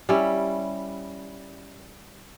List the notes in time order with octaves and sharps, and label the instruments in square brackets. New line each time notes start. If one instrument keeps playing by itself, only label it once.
[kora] G3 C#4 E4